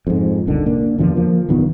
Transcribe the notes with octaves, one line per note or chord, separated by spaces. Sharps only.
F2 G#2
D#1 C2 D3 D#3
A#3 D4
E2 G2 D3 F3
F3 A#3
D1 G2 D#3 B3